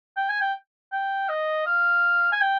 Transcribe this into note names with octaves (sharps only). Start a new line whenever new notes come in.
G5
G#5
G5
G5
D#5
F5
G#5
G5